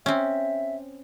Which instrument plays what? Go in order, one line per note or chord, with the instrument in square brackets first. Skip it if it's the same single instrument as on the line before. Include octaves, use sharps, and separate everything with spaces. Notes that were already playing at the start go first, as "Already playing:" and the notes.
[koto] C4 C#4 [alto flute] E5